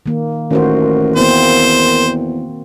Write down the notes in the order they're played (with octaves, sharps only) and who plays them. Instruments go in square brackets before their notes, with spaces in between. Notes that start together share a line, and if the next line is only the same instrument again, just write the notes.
[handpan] D#3 A#3
[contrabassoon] A1 [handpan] D#3 F#4 C5 [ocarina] A#4
[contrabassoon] E2 [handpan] A#3 C4 [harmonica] C5